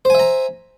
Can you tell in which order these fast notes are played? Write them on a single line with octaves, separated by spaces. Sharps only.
C5 G#5 E5 A#5